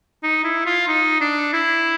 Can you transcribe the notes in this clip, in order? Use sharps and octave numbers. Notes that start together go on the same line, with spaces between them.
D#4
E4
F4
D#4
D4
E4